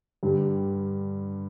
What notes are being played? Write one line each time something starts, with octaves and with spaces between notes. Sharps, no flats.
G2 D3 G3